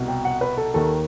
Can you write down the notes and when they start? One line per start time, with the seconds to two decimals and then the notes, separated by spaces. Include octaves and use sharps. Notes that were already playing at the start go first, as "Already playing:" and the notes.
Already playing: C2 B2
0.08 G5
0.25 F#5
0.41 B4
0.58 A4
0.74 D#2 D#3 A4